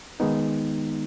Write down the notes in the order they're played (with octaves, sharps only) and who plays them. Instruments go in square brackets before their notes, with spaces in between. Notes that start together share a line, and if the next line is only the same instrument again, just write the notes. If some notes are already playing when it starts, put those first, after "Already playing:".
[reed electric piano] D#3 G#3 B3 D#4